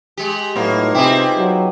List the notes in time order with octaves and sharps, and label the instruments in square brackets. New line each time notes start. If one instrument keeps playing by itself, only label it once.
[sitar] G#3 G4
[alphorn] A2 [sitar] F#3 A#3 [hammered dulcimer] B3 D#4 F4
[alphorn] C3 [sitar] C4 E4 [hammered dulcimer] G4 G#4 D#5
[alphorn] F#3